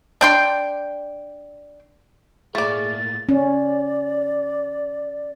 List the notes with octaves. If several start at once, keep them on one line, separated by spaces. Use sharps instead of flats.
D4 G5 C6
A2 A3 A#3 G#4 D5 A6
C#4 D5